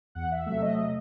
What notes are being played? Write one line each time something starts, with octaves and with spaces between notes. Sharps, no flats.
E2 F#5
E5
C3 F#3 A3 E5
D#5
D#5